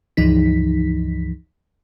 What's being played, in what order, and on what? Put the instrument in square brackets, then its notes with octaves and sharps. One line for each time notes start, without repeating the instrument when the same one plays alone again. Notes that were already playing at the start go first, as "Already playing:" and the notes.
[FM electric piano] C#2 G2 E3 F3 D#4 B6